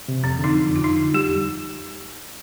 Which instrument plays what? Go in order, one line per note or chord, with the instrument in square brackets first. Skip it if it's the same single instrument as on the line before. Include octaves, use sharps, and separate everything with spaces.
[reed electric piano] C3
[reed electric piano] F2 [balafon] C4
[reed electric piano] D3
[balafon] D#4
[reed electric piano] F3
F2
[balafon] F4
[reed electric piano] F2 [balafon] D#4
[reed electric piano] D3
[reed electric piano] G3 [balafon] G4
[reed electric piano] F2